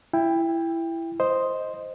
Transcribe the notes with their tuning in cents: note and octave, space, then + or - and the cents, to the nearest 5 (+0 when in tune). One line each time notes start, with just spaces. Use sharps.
E4 +10 G5 +20
C5 +0 D#5 +0